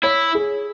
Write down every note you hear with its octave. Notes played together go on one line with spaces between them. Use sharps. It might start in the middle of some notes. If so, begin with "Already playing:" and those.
E4 C#5
G#4